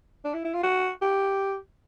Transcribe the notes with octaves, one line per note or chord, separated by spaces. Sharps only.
D4
E4
E4
F4
F#4
G4